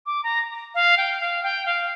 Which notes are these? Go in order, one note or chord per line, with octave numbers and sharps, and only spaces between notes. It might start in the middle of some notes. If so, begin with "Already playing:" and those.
D6
A#5
F5
G5
F5
G5
F5